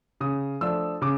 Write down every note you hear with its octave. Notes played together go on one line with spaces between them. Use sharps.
C#3 D#6
F3 A3 D4 E6
C#3 D6